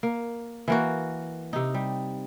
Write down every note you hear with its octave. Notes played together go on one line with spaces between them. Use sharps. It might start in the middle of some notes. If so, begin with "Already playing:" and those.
A#3
E3 A#3 F#4
C3 D#4
G3